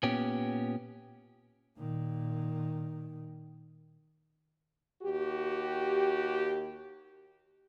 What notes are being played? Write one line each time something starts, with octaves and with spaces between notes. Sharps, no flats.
A#2 B3 C#4 G4
A#2 D#3
D#2 F#4 G4